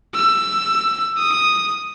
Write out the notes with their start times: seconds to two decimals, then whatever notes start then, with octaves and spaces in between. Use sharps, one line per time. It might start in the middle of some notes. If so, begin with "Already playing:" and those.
0.15 E6
1.18 D#6